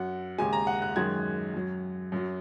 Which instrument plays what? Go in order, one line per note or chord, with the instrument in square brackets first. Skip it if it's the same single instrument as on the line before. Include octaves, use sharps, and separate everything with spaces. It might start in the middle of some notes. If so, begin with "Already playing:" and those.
Already playing: [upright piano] F#2 F#3 F#5
D#2 C#3 G#3 G#5
A#5
F#5
F#6
F#2 D#3 G#3 G#6
F#2 F#3
F#2 F#3